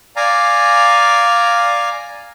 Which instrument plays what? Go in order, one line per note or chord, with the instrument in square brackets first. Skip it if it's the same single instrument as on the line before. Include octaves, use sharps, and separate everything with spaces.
[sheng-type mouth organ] D5 F5 G#5 A#5